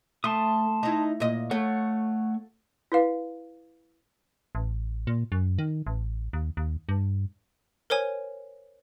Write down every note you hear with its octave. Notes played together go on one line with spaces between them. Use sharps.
A3 A5 C6 D#6
D#4 E4
A#2 D#5
A3 C#5 F#5
E4 B4 F5
A1
A#2
F#2
D#3
A1
D#2
D#2
G2
A#4 C5 C#5 G#5